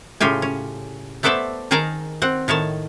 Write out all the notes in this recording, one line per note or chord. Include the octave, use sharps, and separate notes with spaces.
A2 C#3 F4 G4 G#5
C#4
A3 B3 A4 C5 D5 E5
D#3 D#4 G#4 A#4 A5 A#5
C4 F#5
A2 D#3 C#5 A5